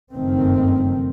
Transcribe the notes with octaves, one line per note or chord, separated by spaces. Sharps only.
F#1 G2 D#3 A3 C4